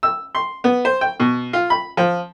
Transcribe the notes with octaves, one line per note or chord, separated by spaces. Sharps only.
E6
C6
B3
C5
G5
B2
F4
B5
F3